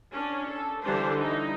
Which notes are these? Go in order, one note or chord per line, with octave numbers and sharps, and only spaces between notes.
C#4 D4
A4
D3 E3 G3 D4 C5
D#4 E4